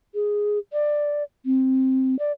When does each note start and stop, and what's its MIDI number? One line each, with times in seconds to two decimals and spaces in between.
0.15 0.59 68
0.73 1.23 74
1.45 2.18 60
2.19 2.32 74